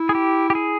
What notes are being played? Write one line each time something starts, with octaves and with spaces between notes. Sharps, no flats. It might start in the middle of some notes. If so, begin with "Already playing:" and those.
Already playing: E4
G#4
G4
G4
G#4